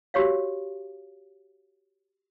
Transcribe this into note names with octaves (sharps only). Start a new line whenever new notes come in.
F#4 G4 C#5 F5